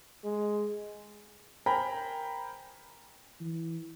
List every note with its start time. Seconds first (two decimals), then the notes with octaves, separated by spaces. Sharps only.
0.24 G#3
1.66 A#4 C5 G5 G#5 A#5 B5
3.40 E3